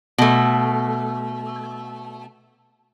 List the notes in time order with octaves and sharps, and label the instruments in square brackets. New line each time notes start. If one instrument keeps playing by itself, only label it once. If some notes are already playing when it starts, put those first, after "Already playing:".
[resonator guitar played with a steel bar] B2 A3